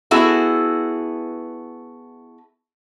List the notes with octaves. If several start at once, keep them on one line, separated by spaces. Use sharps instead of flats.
B3 E4 F#4 G#4 A4